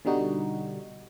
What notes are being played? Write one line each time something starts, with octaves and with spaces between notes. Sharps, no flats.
B2 D3 G3 D#4 F#4